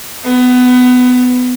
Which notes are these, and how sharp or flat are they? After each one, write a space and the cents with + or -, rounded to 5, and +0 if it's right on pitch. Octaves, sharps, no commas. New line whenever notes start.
B3 +20